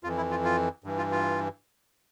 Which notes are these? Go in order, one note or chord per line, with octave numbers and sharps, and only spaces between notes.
F2 E3 F4
E4
F4
F4
G2 E3
F4
F4